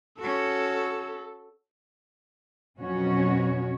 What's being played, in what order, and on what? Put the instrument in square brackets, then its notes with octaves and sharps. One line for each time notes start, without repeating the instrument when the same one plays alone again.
[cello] C#4 F#4 [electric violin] A4
[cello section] F2 B2 F#3 C#4 F#4 C#5